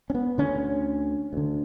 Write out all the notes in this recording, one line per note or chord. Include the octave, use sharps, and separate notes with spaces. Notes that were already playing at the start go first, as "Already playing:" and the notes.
C#4
B3
D2 D3 C#4
D2 D3